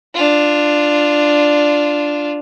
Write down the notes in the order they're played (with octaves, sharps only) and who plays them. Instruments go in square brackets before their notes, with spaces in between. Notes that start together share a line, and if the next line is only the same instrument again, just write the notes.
[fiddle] D4 F4